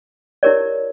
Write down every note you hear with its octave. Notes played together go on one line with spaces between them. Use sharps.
E4 G4 A#4 C#5 D5